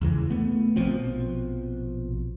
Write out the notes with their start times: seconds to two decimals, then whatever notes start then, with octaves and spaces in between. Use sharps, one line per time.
0.01 E2 C#3 E3
0.30 A3 B3
0.76 A#1 B2 F3 C4